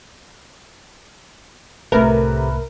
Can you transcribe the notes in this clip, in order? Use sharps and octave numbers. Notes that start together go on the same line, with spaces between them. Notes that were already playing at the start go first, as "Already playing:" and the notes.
C2 A2 C3 A3 A#4 B4 E5 B5